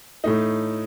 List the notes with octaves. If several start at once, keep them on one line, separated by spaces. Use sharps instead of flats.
A2 A3 D#4